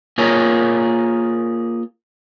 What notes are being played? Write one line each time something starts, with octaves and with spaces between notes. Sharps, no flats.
A#3 F4 G#4 A#4 C#5